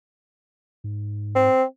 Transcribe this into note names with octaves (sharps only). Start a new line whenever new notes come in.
G#2
C4